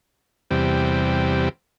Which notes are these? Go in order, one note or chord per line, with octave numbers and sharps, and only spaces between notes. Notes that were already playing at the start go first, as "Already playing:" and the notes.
E2 C3 G3